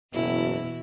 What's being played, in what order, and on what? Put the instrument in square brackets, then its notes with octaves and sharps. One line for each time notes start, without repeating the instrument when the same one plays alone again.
[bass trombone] F#1 [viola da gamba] E2 B2 E4